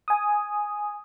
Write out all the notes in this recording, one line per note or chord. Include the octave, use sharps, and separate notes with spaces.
G#5 D#6